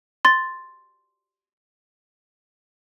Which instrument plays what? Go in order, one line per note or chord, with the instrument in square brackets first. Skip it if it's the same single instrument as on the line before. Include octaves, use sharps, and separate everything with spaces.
[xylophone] C6 A6